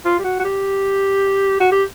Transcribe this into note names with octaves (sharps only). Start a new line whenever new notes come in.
F4
G4
F#4
F#4
G4
F#4
G4